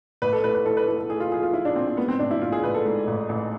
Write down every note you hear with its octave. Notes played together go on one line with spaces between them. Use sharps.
A1 B4
A4
A2 B4
B4
A2 A4
B4
A2 A4
A4
A2 G#4
F4
F3 G#4
F4
F3 E4
D4
A2 C4
C4
G#2 B3
C4
A1 D4
E4
A1 F4
G#4
A1 B4
A4
G#2
A1
A1